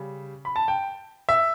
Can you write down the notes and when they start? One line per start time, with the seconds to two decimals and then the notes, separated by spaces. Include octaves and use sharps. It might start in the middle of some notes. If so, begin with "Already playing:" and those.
Already playing: C#3 G3
0.45 B5
0.56 A5
0.68 G5
1.29 E5